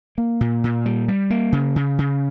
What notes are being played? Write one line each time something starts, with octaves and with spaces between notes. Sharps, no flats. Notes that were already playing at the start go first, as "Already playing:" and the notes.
A#3
A#2
A#2
G3
G3
A#3
C#3
C#3
C#3